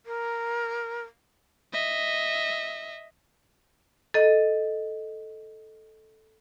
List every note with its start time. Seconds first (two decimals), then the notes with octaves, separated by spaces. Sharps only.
0.06 A#4
1.73 D#5 E5
4.14 A4 D#5